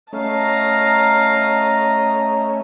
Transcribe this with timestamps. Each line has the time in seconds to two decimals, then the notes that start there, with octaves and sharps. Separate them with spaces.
0.13 A3 C#4 D#5 F5 A5 A#5